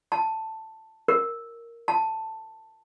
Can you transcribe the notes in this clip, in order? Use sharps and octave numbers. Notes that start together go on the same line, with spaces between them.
A5
A#4
A5